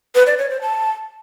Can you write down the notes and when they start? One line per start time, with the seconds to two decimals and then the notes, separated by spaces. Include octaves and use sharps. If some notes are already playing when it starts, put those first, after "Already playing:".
0.15 B4
0.27 D5
0.38 C#5
0.50 C5
0.62 A5